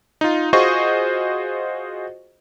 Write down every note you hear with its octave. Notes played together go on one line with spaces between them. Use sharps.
D#4 F4
F4 F#4 G#4 C5 D#5 C#6